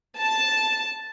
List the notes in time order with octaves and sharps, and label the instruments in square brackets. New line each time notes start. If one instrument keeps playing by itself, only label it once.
[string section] A5